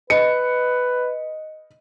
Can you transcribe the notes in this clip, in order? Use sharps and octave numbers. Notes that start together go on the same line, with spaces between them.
B4 D#5 C#7